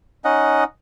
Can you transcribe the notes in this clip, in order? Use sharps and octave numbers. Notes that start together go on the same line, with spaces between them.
C#4 D#4 D#5 F#5